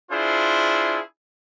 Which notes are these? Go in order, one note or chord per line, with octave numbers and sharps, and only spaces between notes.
D4 E4 F4 G#4 C5